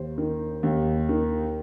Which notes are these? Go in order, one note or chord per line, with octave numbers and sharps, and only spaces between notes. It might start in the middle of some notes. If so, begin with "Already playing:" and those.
Already playing: D#2 C5
D#3
D#2
D#3